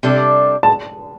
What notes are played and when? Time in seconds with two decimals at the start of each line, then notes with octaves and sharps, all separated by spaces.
0.03 C3 G3 D4 A4
0.63 A5